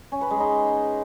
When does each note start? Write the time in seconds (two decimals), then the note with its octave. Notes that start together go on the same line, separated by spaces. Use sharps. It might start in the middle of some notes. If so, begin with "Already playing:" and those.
0.12 C#4
0.21 B4
0.30 G#3
0.40 D#4